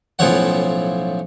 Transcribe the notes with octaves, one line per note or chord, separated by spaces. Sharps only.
B1 A2 C#3 F3 C#5 F#5